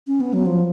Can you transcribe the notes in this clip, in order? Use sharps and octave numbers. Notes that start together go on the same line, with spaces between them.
C#4
B3
F#3
F3